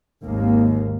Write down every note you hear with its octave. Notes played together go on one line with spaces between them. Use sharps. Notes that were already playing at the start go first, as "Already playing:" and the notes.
G#1 D#2 A#3